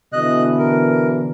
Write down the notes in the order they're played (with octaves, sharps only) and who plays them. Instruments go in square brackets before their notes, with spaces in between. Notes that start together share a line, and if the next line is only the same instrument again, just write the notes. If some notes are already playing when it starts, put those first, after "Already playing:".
[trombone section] B2 D3 E3 [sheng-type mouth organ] D#5 F#6
[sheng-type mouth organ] A#4